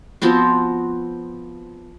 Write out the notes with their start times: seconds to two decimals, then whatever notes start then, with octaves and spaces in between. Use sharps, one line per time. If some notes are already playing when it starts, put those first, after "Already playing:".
0.22 F3 B3 C4 F#4